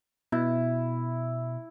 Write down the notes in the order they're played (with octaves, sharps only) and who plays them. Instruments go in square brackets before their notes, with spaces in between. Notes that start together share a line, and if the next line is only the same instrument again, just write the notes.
[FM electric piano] B2 [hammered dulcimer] E4